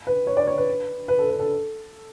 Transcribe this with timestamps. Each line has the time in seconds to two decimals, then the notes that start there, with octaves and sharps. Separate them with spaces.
0.07 B4
0.27 C#5
0.37 D5
0.47 C#5
0.57 B4
1.08 B4
1.19 A4
1.29 B4
1.39 A4